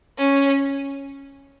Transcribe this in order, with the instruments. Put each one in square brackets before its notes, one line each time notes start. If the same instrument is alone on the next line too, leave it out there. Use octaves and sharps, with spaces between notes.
[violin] C#4